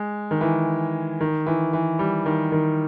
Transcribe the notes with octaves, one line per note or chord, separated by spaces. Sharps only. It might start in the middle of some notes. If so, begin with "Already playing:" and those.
Already playing: G#3
D#3
E3
D#3
E3
E3
G3
D#3
D#3